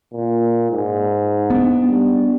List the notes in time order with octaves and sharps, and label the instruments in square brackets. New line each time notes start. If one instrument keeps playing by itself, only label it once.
[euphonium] A#2
G#2
[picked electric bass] B3 D4
[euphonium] G3